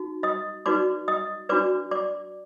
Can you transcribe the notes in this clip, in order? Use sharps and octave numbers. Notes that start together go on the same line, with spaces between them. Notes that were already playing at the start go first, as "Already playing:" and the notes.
Already playing: D#4 F#4
D#5 D#6
D#4 F#4 B4 D5 D6
D#5 D#6
D4 F#4 B4 D5 D6
D5 D6